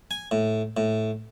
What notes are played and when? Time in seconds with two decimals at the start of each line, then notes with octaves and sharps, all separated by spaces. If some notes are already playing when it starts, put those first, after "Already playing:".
0.11 G#5
0.31 A2
0.77 A2